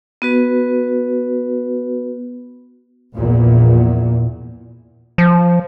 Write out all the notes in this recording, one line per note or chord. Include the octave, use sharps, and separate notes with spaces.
B3 F#4 B4
A#1 E2 A#2
F3